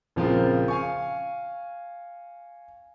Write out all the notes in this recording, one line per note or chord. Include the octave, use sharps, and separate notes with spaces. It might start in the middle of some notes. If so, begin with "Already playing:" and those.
A#1 C#3 F3 C4 F4 A#4
F5 G#5 C#6